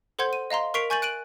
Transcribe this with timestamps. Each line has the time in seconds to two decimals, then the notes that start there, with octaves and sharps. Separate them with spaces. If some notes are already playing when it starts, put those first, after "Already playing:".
0.19 A4 C5 F#5 C6 G6 G#6
0.33 D#7
0.50 D#5 F5 A#5 C6
0.74 A#4 C#6 B6 C7 D7 F7
0.90 G#5 C#6 G6 A6 D#7 F#7
1.02 F#6 D7 D#7 F#7